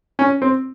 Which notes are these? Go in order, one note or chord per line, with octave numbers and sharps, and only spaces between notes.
C#4
C4